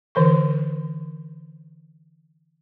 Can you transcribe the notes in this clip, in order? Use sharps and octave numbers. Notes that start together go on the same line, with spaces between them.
D3 E3 A#4 C#6